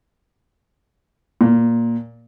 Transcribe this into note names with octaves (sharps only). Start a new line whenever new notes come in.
A#2